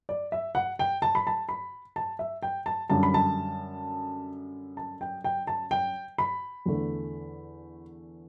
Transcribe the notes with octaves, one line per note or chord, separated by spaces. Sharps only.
D5
E5
F#5
G5
A5
B5
A5
B5
A5
E5
G5
A5
F#2 D3 G3 A5
B5
A5
A5
G5
G5
A5
G5
B5
E2 D3 A3